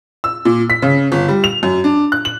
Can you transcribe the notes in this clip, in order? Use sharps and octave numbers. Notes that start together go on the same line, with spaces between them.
E6
A#2
B6
C#3
G1
G3
F7
F#2
D4
F#6
F#7